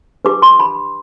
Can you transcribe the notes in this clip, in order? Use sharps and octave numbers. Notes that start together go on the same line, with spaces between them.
D4 G4 B4 D6
C6
B5